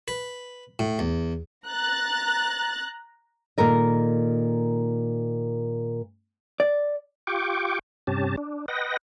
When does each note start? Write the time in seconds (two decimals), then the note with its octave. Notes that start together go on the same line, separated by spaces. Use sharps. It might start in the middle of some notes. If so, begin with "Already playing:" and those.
0.08 B4
0.79 A2
0.99 E2
1.67 A#5 F#6 A6
3.58 A#2 D#3 A4 A#4 D#5
6.60 D5
7.27 F4 G4 G5 C#6 D6
8.07 G2 C3 C#4 G4 A5
8.37 D4
8.68 B4 D#5 F#5 G5 A#6